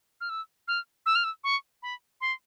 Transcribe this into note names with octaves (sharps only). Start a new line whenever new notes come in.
F6
E6
F6
E6
F6
E6
C#6
B5
C6